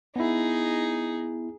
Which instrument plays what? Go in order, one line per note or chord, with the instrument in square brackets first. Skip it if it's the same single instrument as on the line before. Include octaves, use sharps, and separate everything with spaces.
[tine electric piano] B3 E4 [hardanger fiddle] D#4 G#4